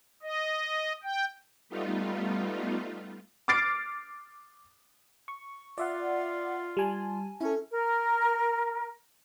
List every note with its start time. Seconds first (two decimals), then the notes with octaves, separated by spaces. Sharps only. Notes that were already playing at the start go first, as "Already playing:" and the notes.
0.23 D#5
1.04 G5
1.69 G3 A3 B3 D#4 F4
3.48 D6 F6 A6 C7 D7
5.28 C#6
5.78 F4 D5 E5 F#5
6.77 G3 G#5 A5
7.41 C#4 E4 A4
7.72 A#4